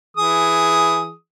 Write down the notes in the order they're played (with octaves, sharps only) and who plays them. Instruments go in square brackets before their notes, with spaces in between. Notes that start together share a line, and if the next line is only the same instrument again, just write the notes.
[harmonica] E3 G#4 D#6